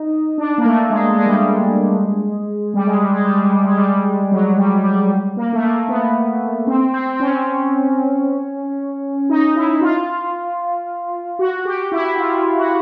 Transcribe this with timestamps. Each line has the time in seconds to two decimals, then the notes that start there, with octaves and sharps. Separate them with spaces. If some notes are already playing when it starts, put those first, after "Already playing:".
Already playing: D#4
0.38 D4
0.58 A#3
0.65 A3
0.90 G#3
1.17 G#3
1.26 G3
1.34 G#3
2.74 G3
2.87 G#3
2.99 G3
3.13 G#3
3.25 G3
3.38 G#3
3.51 G3
3.64 G#3
3.77 G3
4.32 F#3
4.58 G3
4.84 G3
5.37 A#3
5.53 A3
5.62 A#3
5.88 B3
6.67 C4
6.94 C4
7.13 C4
7.20 C#4
9.29 D#4
9.56 E4
9.81 F4
11.39 F#4
11.65 G4
11.92 E4
12.18 F4
12.57 F#4